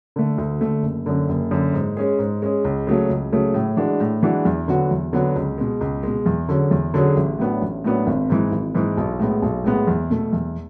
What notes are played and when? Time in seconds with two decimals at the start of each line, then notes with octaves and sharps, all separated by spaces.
0.16 D3 A3
0.38 D2
0.60 D3 A3
0.83 F#1
1.06 F#2 D3
1.29 F#1
1.51 F#2 D3
1.74 G#2
1.97 G#3 C#4 G#4
2.19 G#2
2.42 G#3 C#4 G#4
2.64 C#2
2.87 C#3 F#3 A3
3.10 C#2
3.32 C#3 F#3 A3
3.54 A2
3.77 E3 G#3 D4 F#4
4.00 A2
4.23 E3 G#3 D4 F#4
4.45 E2
4.68 D3 F#3 B3 F#4
4.90 E2
5.13 D3 F#3 B3 F#4
5.36 C#2
5.58 B2 G#3
5.81 C#2
6.03 B2 G#3
6.26 E2
6.49 D3 F#3 C#4 G#4
6.71 E2
6.94 D3 F#3 C#4 G#4
7.17 A1
7.39 A2 F#3 B3 D4
7.62 A1
7.84 A2 F#3 B3 D4
8.07 G#1
8.30 G#2 E3
8.52 G#1
8.75 G#2 E3
8.97 B1
9.20 A2 G#3 B3
9.42 B1
9.64 A2 G#3 B3
9.87 E2
10.10 B2 A3
10.33 E2